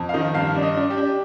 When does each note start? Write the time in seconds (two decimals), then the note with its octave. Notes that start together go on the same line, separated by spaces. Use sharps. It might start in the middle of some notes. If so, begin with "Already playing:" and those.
Already playing: F2
0.09 F5
0.14 D#3 D#5
0.34 G2 F5
0.55 D4
0.63 D#5
0.77 D4
0.90 G4
0.97 D4